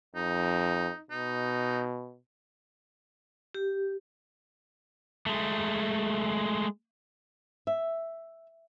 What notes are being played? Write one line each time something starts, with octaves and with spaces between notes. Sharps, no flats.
F2 D#4
B2 D#4
G4
G#3 A3
E5